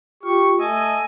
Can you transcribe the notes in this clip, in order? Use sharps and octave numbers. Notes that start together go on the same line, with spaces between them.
F4 G4 C#6
A3 D#5 G#5 A5 E6